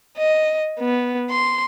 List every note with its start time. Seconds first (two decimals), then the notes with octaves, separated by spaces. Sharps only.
0.18 D#5
0.79 B3
1.30 C6